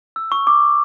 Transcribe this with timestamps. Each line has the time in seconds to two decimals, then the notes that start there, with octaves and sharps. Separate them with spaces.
0.16 E6
0.32 C#6
0.47 D6